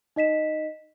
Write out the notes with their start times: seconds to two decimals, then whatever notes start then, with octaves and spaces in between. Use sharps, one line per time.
0.16 D#4 D#5 B6 E7